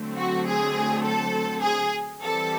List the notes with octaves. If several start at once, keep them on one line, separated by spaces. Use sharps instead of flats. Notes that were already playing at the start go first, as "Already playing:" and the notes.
Already playing: D3 F#3 A3 C4
F#4
G#4
A4
G#4
E3 G3 C4 A4